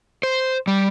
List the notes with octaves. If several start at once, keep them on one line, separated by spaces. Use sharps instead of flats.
C5
G3